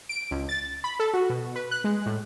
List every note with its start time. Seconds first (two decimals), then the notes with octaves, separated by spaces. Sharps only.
0.09 D7
0.31 C#2
0.49 A6
0.84 B5
1.00 A4
1.14 F#4
1.30 B2
1.56 B4
1.71 F#6
1.84 G#3
2.06 A2